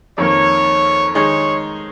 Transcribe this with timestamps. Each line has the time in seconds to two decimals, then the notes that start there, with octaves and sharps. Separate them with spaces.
0.17 F2 D#3 A#3 C#5
1.15 D#3 G#3 D#4 G#4 C#5